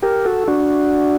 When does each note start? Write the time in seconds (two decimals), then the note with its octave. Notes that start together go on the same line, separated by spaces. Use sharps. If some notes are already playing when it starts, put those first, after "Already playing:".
0.02 G4 A#4
0.25 F#4 A4
0.48 D4 F#4